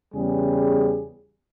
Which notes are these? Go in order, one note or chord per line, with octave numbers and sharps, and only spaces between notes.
E2 C#3 G3 G#4